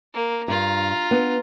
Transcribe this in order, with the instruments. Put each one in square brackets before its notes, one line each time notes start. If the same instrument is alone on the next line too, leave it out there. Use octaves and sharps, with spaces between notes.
[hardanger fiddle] A#3
[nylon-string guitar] G2 [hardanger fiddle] F4 A#5
[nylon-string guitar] B3 D4